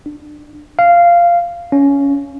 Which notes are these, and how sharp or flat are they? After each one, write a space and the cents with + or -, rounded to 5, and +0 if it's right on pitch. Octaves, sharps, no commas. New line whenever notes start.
D4 +20
F5 -10
C#4 +15